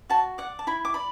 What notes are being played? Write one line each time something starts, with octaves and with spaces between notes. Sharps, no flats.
F#4 A5
D5 F#5
A5
E4 B5
D6
D5 B5